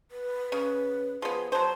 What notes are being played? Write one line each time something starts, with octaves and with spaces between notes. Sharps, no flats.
B4
C#3 B4
F3 B3 G#4
F#3 C5 A5